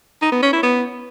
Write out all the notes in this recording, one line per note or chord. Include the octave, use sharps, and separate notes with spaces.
D#4
B3
C#4
E4
B3